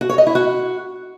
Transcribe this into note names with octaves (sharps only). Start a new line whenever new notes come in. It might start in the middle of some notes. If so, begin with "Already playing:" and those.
F#4
C#5
D#5
E4
F#4